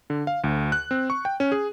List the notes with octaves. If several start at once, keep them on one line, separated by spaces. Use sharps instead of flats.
D3
F5
D2
F#6
C4
C#6
G5
C#4
G#4